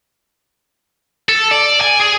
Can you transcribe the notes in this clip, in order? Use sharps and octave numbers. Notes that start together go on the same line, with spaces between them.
A4
D5
G#5
G#4